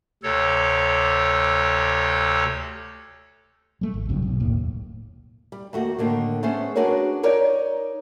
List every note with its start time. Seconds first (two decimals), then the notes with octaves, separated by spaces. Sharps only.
0.23 D2 C3 A4 C#5
3.81 G3 A3
3.94 G#1
4.09 C2 G2 C#3 F#3
4.22 B1
4.40 F1 D#2 A2 A#3
5.52 G3
5.73 D#2 A3 F#4
5.98 A2 D3 D#3 A#3
6.43 A3 B3 C#4 G#4 C5
6.75 D4 F#4 G#4 A#4 B4 C#5
7.23 D#4 A#4 C#5 D5